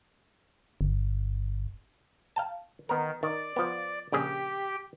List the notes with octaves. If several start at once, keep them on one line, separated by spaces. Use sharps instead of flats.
G1
F5 G5 A5
D#3 B3 A#4
D#3 D5
F3 B3
A#1 C#3 G4 G#4 G5